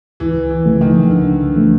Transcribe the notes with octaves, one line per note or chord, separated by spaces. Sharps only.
C#2 E3
E3
C#3 F3 A3
D#3
C#2 D3
C#3 F3 A3